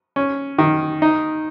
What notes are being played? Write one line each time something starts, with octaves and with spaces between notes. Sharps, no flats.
C#4
D#3
D#4